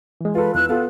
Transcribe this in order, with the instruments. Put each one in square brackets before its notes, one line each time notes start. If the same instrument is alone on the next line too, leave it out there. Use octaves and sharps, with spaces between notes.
[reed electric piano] E3 G#3
[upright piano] F4 A4 [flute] B4
[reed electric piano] E2 E3 E6 [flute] F#6
[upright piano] B3 F4 [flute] A4 [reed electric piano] F5